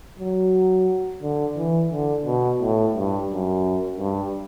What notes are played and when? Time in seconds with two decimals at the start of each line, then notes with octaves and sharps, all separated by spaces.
0.19 F#3
1.22 D3
1.57 E3
1.92 D3
2.26 B2
2.61 A2
2.94 G2
3.30 F#2
3.98 G2